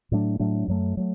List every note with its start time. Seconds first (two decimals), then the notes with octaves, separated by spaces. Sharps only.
0.12 A2 F#3 A3 D4
0.39 A2 F#3 A3 D4
0.68 F#2 F#3 A3
0.97 F#3 A3